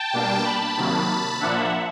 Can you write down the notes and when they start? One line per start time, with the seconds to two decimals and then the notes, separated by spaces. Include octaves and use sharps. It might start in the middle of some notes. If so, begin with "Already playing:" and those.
Already playing: G5 A5
0.13 B2 G3 A#3 D4
0.45 A5 B5
0.77 C3 D#3 F#3 A#3
1.41 A#2 F3 A#3 D4 E5 F#5